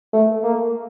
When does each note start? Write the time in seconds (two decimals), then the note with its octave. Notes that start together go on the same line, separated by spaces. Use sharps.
0.13 A3
0.43 A#3